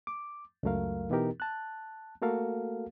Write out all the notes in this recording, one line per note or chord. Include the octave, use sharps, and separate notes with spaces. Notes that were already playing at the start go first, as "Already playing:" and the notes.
D6
C#2 F#2 F#3 A3 A#4 F5
B2 E3 B3 D#4 G4 A#4
A5 F#6
A3 A#3 F#4 A4 A#4 F5